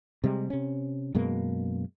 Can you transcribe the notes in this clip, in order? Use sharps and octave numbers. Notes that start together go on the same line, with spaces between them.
C3 G3 G#3
C3 C#4
F#2 B2 G#3 A#3